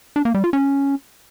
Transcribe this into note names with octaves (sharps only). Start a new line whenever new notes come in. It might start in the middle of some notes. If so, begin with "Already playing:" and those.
D4
A#3
G3
F4
C#4